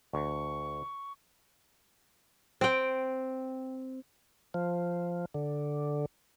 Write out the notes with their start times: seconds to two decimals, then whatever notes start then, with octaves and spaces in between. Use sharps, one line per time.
0.13 D2 C#6
2.61 C4 G5
4.54 F3
5.34 D3